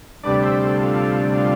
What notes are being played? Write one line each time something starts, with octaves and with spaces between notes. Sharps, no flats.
D2 C3 G3 D4 B4 D5
C5 E5
A4 C5
F4 A4
F4